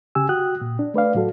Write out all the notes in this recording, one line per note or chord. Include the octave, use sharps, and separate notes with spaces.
C#3 G4 G#5 E6
F#4 G5 D#6 F#6
A#2
D4
A3 B4 D5 F5
A2 F#3 F#4 A4